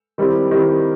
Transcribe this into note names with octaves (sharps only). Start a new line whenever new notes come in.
D#3 G3 C4 E4 G4
D#3 G3 C4 E4 G4